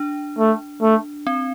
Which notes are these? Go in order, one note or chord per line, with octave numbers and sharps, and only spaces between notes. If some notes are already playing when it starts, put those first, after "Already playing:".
Already playing: D4
A3
A3
C4